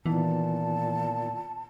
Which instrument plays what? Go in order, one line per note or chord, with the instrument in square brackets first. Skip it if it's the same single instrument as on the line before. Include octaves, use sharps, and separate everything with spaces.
[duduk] A#2 [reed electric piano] D#3 B3 E4 [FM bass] E3 [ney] A5